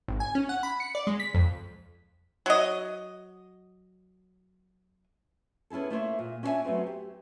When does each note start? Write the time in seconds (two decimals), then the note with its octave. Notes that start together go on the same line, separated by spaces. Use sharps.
0.08 G#1
0.20 G#5
0.35 C#4
0.49 F#5
0.63 B5
0.80 C#7
0.95 D5
1.07 G#3
1.20 B6
1.34 F2
2.46 F#3 D#5
5.70 B3 C#4 E4 G#4 A4
5.90 A3 A#3 E4 C5 C#5
6.19 A#2
6.43 C#4 D4 E4 D#5 E5 G#5
6.65 F#3 A3 B3 C4
6.87 G4